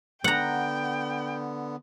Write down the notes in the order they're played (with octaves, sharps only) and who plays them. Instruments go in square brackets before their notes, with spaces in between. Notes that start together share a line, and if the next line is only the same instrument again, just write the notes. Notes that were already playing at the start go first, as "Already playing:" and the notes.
[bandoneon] D3 B3 [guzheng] F#5 A#5 [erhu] G5